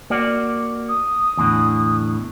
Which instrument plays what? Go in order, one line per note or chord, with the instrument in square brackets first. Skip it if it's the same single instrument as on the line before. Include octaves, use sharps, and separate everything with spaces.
[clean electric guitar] A#3 F#4 D5
[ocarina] D#6
[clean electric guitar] E2 A2 D3